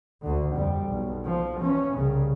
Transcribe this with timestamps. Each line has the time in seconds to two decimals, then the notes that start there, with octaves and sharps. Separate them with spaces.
0.22 D2 D3
0.55 F2 G3
0.89 B1
1.24 F3
1.59 E3 C#4
1.95 C2 C#3